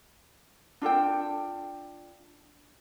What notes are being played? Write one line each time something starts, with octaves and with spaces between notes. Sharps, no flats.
D4 F4 A4 G5